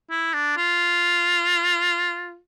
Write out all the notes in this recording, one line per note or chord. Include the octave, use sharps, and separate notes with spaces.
E4
D4
F4